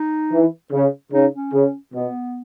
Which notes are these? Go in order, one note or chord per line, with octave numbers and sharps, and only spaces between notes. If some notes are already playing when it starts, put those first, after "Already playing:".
Already playing: D#4
E3
C#3 C#4
C#3 D#4
C#4
C#3
B2 B3